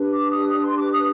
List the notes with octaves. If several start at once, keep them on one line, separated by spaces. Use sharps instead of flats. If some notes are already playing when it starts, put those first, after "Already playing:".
Already playing: D4 G4 B4
D6
D#6
D#6
C6
D6
D#6